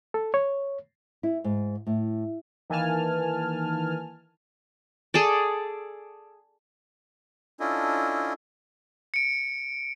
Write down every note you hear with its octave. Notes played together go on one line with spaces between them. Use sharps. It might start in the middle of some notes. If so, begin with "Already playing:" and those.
A4
C#5
E4
G#2
A2
D#3 E3 A#3 G#5 A5 F6
G#4 A4 D5
C#4 D4 E4 F4 A4 D#5
C#7 D7